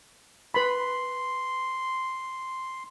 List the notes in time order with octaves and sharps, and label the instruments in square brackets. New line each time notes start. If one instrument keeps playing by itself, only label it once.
[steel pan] B4 B5 [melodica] C6